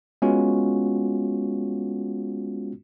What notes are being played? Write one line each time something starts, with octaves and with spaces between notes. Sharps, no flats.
G#3 B3 C#4 F4 F#4